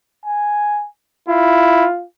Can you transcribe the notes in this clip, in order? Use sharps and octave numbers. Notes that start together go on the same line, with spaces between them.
G#5
E4 F4